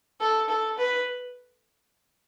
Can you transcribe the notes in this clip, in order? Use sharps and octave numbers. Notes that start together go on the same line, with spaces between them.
A4
A4
B4